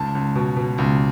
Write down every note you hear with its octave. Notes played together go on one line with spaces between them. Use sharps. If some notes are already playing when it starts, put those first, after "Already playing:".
Already playing: C#2 A5
C#2
B2
B2
C#2